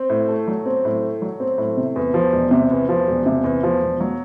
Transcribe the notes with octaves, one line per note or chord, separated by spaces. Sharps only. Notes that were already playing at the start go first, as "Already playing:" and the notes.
Already playing: C4
A2
A3
F#3
C4
A2
A3
F#3
C4
A2
C3
E2
F3
E1
C3
E2
F3
E1
C3
E2
F3
E1
F#3